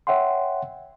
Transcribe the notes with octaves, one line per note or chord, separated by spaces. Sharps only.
C#5 E5 F#5 G5 C6